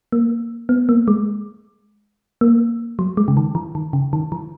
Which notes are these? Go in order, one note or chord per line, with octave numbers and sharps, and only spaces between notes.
A#3
B3
A#3
G#3
A#3
F#3
G#3
C#3
D#3
E3
D#3
C#3
D#3
E3